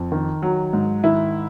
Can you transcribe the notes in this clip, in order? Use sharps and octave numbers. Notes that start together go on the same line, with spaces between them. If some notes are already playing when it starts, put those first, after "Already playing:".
Already playing: F2
D#3
F#3
G#2
D#3 E4